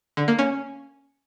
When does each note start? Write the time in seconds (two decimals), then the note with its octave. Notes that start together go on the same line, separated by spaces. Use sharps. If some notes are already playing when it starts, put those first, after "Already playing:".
0.17 D3
0.28 A#3
0.39 C#4